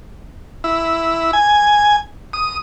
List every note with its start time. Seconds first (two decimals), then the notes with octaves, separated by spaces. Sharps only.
0.64 E4
1.33 G#5
2.33 D#6